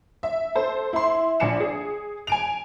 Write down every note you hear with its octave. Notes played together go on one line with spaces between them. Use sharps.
E5
A4 C5
E4 C6
A#1 D4 G#5 C#7 E7
G#4
G#5 D7 F7